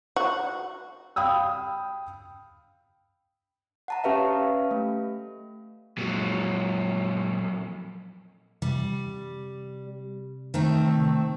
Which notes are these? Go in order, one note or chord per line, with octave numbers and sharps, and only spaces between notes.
F#4
F5 G5 B5 D#6 E6
F#5 A5 A#5
C#4 G4 B4 E5 F5
A3
F2 A#2 F#3 G#3
C3 G3
D#3 A3 C4